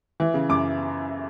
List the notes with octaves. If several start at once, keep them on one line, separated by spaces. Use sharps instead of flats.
E3
C#3
F#2 D6